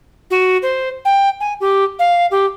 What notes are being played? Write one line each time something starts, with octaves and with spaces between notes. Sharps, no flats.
F#4
C5
G5
G#5
G4
F5
G4